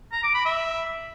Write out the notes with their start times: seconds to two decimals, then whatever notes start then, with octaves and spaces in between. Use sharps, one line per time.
0.12 A#5
0.23 D6
0.34 B5
0.46 E5